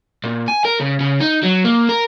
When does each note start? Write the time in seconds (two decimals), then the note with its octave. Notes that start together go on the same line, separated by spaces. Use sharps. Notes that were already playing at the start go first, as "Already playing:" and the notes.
0.24 A#2
0.48 G#5
0.65 A#4
0.80 C#3
1.01 C#3
1.21 D#4
1.43 F#3
1.65 A#3
1.89 A#4